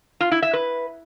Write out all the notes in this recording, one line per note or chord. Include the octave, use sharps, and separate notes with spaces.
F4
E4
E5
B4